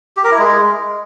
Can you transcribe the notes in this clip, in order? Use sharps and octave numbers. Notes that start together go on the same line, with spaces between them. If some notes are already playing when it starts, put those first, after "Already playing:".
G4
A#4
E4
G#3